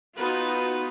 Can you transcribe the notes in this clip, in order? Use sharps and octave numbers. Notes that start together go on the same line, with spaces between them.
B3 D#4 F4 F#4 B4